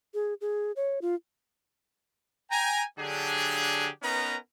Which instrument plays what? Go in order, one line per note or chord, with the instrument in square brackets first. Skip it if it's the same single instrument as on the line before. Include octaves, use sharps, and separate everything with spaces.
[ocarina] G#4
G#4
C#5
F4
[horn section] G5 G#5 A#5
D3 F#3 D4 G4 G#4
B3 C#4 D#4 A#4 B4 A#5